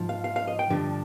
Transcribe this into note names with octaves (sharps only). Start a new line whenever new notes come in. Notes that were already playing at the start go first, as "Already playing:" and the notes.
Already playing: G#2 F3
F5
F5
F5
D#5
G5
G2 D3 F3